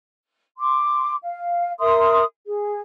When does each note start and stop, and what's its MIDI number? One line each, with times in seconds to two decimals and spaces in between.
0.58 1.15 84
0.58 1.15 86
1.23 1.73 77
1.80 2.22 70
1.80 2.22 76
1.80 2.22 84
1.80 2.22 87
2.46 2.80 68